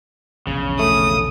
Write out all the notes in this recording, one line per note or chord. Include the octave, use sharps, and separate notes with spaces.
E1 A#1 C#3
A3 D#6